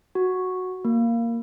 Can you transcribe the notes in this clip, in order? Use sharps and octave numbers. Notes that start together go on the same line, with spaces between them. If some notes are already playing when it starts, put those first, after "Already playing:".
F#4
A#3